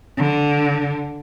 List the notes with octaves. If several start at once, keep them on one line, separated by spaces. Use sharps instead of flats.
D3